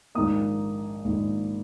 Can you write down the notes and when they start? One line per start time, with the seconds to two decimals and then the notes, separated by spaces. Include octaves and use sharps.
0.15 A#1 G#2 D#3 A#3 D#6
1.04 A#1 G#2 D#3 A#3